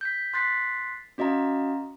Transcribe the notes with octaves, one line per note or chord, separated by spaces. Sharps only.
G6 B6
C6 F#6 A6 B6 C7
C#4 F#4 D#5 F5 A#5